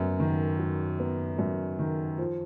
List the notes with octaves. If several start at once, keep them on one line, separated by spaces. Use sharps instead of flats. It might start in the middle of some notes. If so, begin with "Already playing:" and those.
Already playing: F#2 F#3 B3
D#3
F#3
B3
F#2
D#3
F3